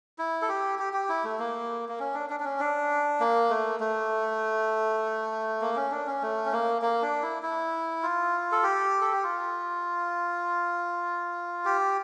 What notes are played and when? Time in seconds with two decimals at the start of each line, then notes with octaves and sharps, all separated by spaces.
0.18 E4
0.42 A4
0.49 G4
0.79 G4
0.93 G4
1.09 E4
1.24 A3
1.39 A#3
1.89 A#3
1.99 C#4
2.14 D4
2.30 D4
2.40 D4
2.44 C#4
2.60 D4
3.20 A#3
3.50 A3
3.80 A3
5.61 A#3
5.76 C#4
5.91 D4
6.07 C#4
6.22 A3
6.46 C#4
6.52 A#3
6.82 A#3
7.02 D4
7.22 E4
7.43 E4
8.03 F4
8.52 A4
8.63 G4
9.01 A4
9.13 G4
9.24 F4
11.65 G4